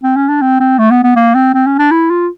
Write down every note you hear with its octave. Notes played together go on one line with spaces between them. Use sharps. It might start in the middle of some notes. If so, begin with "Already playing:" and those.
C4
C#4
D4
C4
C4
A3
B3
B3
A#3
C4
C4
C#4
D4
E4
F4